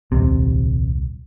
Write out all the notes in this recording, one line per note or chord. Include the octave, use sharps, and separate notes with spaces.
D#1 C2 C3